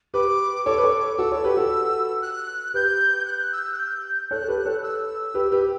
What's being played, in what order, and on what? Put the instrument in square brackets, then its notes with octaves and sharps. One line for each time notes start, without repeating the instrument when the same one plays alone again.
[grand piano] G4 B4 [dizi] D6
[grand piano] A4 C#5 [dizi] D6
[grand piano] B4
A4 C#5
[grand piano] F#4 A4 [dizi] E6
[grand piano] A4 C#5
G4 B4
F#4 A4
[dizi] F#6
[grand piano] G4 B4 [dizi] G6
[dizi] F#6
E6
F#6
G6
[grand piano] A4 C#5 [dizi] F#6
[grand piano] A4
G4 B4
A4 C#5
[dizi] E6
[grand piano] G4 B4
G4 B4